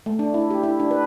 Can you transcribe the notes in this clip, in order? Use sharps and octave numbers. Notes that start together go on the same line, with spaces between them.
A3
D4
E4
G4
E4
D4
B4